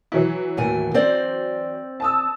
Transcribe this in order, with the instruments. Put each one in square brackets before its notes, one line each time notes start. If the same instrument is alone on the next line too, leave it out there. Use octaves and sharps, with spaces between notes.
[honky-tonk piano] E3 F#3 E4
[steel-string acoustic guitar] D#2 A2 G#5
C4 C5 D5
[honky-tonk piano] A5 D#6 E6